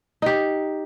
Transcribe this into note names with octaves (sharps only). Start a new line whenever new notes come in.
D#4 G4